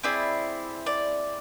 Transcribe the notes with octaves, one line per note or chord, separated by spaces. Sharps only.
C4 E4 G#4 D5
D5